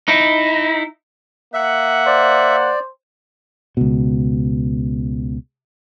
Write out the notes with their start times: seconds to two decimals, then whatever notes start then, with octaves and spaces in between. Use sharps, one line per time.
0.08 D#4 E4
1.54 A#3 E5 F#5
2.07 C5 D5
3.77 C#2 B2